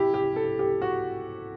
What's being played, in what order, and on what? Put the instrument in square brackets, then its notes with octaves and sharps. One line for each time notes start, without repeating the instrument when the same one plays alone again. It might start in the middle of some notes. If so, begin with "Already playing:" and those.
Already playing: [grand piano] E4 G4
G4
A4
G4
F#4